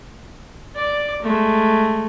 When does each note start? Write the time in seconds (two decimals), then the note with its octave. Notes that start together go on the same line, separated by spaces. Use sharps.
0.75 D5 D6
1.22 G#3 A3